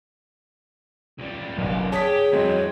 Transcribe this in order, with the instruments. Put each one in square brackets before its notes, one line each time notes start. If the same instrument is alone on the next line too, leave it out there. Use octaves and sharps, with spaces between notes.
[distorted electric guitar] C#2 G3
[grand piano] G1 C2 [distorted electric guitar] F#2 F5 [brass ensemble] D#3
[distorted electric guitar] G4 [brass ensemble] G#4 [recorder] C#5 [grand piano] A5 D#6 B6
[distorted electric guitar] F2 E3 [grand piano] F#3 G#3 C4